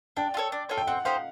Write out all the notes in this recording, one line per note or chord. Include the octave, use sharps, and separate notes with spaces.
D4 G5
F4
A4 C#5
D4
F4 A4 C#5
G5
C4 F#5
D#4 G4 C5 F5